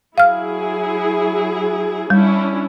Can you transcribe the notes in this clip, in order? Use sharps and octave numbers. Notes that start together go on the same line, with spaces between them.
F#3 E4 G#4 F5 F6
G3 C#4 D4 E4